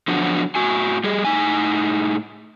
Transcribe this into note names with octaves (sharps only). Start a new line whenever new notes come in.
D3 F3 F#3 B3 D4 F#5
A2 F#4 G#5
G3 G#4
A2 D#4 G#5